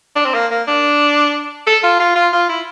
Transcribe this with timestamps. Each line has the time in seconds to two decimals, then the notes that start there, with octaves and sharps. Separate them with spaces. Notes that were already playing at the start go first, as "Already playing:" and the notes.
0.16 D4
0.25 C4
0.34 A#3
0.51 A#3
0.68 D4
1.67 A4
1.83 F4
2.00 F4
2.16 F4
2.33 F4
2.49 E4